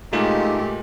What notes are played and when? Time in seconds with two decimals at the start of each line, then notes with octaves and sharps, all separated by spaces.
0.13 A#2 G#3 A3 D#4 F4 G4